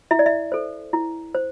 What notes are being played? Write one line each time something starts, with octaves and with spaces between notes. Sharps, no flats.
E4 E5
D5
E5
A4 C5
E4
C5